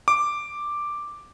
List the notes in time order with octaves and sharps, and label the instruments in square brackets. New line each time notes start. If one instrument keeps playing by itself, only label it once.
[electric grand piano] D6